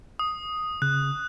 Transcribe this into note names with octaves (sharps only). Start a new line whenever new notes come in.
D#6
C#3 F#6